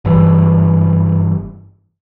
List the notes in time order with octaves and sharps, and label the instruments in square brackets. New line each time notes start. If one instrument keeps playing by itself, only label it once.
[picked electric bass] F#1 G2 E3